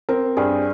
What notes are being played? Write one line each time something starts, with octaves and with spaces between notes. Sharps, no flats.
C4 A#4
G2 G#4